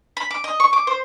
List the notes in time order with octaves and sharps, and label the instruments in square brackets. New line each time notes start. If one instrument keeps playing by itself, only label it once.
[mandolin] B5
D6
D#5
C#6
D6
C5